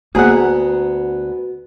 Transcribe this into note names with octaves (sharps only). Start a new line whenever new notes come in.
D2 A#3 B3 F#4 G#4 F#5 A#5